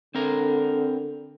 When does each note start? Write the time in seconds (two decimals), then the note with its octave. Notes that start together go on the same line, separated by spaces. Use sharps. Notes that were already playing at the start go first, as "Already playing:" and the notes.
0.15 D3 C4 A#4